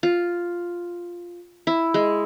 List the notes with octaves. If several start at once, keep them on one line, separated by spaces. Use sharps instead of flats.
F4
E4
G#3